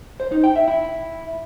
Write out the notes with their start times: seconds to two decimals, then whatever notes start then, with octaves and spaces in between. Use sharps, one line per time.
0.20 C5
0.32 D#4
0.44 G5
0.56 E5
0.68 E4